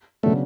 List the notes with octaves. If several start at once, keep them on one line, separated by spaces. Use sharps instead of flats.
C#3 F#3 A3 B3 D4